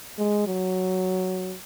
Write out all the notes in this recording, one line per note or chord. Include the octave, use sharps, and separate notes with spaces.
G#3
F#3